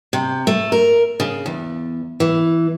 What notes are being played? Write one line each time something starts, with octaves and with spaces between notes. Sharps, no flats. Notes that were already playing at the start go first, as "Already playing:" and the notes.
C3
A3
A#4
C#3
E2
E3